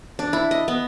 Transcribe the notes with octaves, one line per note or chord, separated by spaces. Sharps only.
D4
E4
D#5
B3